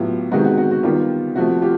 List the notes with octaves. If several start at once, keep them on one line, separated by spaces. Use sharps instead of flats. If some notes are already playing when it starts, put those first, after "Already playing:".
Already playing: A2 F#3 B3 F4 G4
C3 D#3 G#3 B3 F#4
F#4
F#4
F#4
D#3 G3 B3 F4 G4
C3 F3 A3 F#4
F4 G4